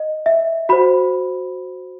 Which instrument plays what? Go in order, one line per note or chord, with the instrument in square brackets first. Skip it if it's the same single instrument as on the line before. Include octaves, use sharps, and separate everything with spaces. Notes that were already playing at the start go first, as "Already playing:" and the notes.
Already playing: [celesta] D#5
E5
F#4 C5 B5